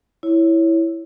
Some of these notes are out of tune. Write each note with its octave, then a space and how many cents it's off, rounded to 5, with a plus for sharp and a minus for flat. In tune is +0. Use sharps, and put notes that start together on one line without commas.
E4 +0 C#5 +0